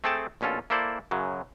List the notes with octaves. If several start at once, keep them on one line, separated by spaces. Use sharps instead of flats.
A3 C4 G#4 A4 G5 A5
A#1 B2 C#4 F4 A4
A#3 E4 A4 C5 D5
F#2 C#3 F#3